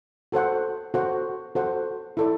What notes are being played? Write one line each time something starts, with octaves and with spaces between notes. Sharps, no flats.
F#4 A4 C5 F#5
F#4 A4 C5 F#5
F#4 A4 C5 F#5
E4 A4 D5